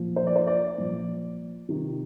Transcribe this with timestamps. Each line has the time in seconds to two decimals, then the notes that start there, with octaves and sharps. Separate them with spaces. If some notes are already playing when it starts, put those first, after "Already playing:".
Already playing: A#2 F3
0.16 C5
0.27 D5
0.36 C5
0.47 D5
0.78 A#2 F3
1.69 C3 D#3